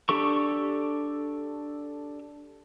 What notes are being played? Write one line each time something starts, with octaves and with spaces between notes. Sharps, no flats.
D4 G4 A4 C#6